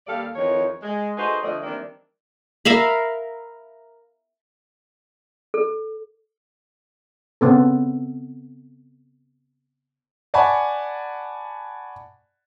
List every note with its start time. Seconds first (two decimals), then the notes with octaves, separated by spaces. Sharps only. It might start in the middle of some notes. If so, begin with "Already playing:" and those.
0.07 D#2 G3 A4 D5 F5
0.36 F2 D#3 E3 C#5
0.82 G#3
1.17 A3 D#4 F#4 G#4 B4 C5
1.43 D3 F3 A3 C4 D5 D#5
1.63 D#3 E3 G3 A#3 C4 D4
2.65 A#4 E5 F5 B5
5.54 A4
7.41 C#3 B3 C4 A4
10.34 D5 F#5 G#5 A5 B5 C#6